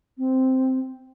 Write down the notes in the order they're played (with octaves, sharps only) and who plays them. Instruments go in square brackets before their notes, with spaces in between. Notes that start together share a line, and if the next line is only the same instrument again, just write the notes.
[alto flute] C4